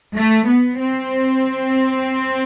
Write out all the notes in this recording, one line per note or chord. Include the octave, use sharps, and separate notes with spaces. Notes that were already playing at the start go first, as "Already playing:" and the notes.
A3
B3
C4